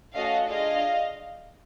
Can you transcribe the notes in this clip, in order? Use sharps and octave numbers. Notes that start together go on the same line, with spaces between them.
A3 C#4 F#4 A4 D#5 F5
D4 F4 G#4 D#5 F5